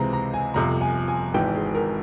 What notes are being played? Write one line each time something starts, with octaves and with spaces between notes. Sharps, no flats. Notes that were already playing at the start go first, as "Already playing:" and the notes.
Already playing: C#2 C3 E3 G#3 C4 A#5
A#5
G#5
G1 F2 C3 A#5
G#5
G#5
G#1 G#2 E3 G5
G#4
A#4